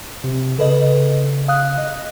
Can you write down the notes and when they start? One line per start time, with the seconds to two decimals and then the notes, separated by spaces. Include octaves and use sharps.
0.24 C3
0.59 C#3 A4 B4 D#5
1.48 F5 D#6 F#6
1.78 D#5